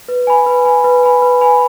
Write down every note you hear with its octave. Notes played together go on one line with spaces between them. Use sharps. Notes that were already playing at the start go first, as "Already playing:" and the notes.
B4
G#5 B5
B4
G#5 B5
B4
G#5 B5
B4
G#5 B5